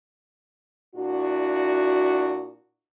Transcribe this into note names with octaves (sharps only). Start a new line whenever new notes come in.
A#2 D4 E4 F#4